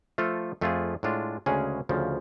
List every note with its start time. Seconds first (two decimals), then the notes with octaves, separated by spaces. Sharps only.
0.18 F3 A3 F4 A4
0.61 F2 F3 A3 F4 G#4
1.03 A2 G#3 D4 F4
1.46 D2 C#3 G#3 C#4 G#4
1.89 D2 C#3 F3